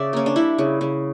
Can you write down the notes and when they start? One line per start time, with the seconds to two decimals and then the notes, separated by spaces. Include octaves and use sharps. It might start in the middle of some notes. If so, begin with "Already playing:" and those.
Already playing: C#3 D5 E5
0.13 A#3 C#4
0.26 D4
0.36 G3 E4
0.58 C#3
0.81 C#3